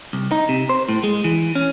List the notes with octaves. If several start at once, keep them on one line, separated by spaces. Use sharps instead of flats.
C2
D#4
C3
C5
A2
G#3
E3
C#4